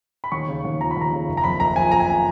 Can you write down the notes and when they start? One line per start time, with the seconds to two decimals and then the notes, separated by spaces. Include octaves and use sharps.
0.24 B5
0.32 D#2 C#6
0.48 C#3
0.64 D#2
0.80 F3 A#5
0.91 B5
0.96 D#2 A#5
1.13 C#3
1.28 F#1
1.37 A#5
1.44 F2 B5
1.60 F#1 A#5
1.76 F3 G#5
1.91 F#1 A#5
2.00 G#5